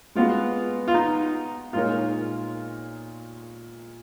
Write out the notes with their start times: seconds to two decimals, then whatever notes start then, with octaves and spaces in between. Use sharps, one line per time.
0.15 G#3 B3 F4 F#4
0.88 F4
0.94 D#4
1.73 A#2 G#3 D#4 F4 A#4 C#5